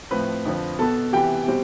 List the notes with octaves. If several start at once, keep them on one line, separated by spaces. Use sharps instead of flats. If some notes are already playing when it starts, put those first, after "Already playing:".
A2 F3 C4 B4 B5
F2 D3 F3 C4
B2 B3 A4 A5
C3 E3 B3 G4 G5
B2 G3 C4